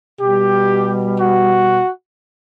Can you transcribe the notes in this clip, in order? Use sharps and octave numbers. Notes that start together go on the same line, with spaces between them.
B2 G3 G4
F#4